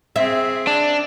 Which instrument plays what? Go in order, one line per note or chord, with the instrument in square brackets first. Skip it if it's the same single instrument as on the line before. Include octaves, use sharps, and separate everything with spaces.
[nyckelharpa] C4 G#4 [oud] E5
[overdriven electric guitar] D4